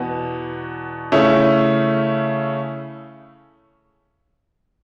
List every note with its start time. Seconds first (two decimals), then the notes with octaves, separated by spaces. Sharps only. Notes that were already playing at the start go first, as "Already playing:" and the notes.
Already playing: E2 B2 B3 F#4
1.12 C#3 A3 C#4 E4